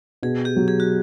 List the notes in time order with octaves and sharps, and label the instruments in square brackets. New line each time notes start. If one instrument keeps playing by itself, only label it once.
[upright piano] B2 [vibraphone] G#4
[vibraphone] G4
[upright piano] F#3
[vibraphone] G#4
F#4